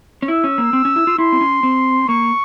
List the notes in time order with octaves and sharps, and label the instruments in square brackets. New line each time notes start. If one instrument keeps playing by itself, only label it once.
[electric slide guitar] C#4
[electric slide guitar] E4 [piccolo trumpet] E6
[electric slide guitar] C#4
A#3
C4
C#4
E4
F4
[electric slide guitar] E4 [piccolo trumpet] C6
[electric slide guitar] C4
C#4
C4
[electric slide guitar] A#3 [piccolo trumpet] C#6